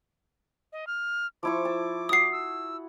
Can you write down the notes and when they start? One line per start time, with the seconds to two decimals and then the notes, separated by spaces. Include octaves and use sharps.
0.72 D#5
0.87 F6
1.43 F3 E4 C#6 D6
1.65 A5
2.09 F#4 F#5 D#6 C7
2.32 E6